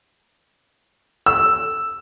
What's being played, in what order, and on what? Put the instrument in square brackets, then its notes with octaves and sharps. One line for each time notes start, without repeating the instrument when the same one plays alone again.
[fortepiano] E6